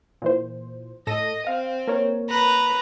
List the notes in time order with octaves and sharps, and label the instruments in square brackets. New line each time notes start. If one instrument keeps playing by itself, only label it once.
[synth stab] A#2 E3 C5
[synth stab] A2 A4 A#6 [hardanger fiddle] D#5
[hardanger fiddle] C4 [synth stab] F5
[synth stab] A#3 A#4 C#5
[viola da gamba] B4 [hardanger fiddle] A#5